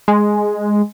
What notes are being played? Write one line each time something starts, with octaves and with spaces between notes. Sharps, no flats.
G#3